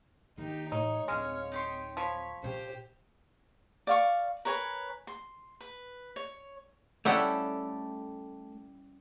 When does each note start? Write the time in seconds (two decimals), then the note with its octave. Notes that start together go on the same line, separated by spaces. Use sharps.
0.38 D#3 A#3 D#4 G4
0.72 A2 E3 D#4 C#5
1.08 D1 G#3 C4 C#4 F5
1.52 D#4 G4 C6
1.97 F3 C#5 B5
2.43 A#2 C#4 G4 C5
3.87 D5 F5 C#6
4.45 A#4 B4 C#5 G#5
5.07 C6
5.61 B4
6.16 C#5
7.05 G3 A3 C#4 E4 G4 A4 F#5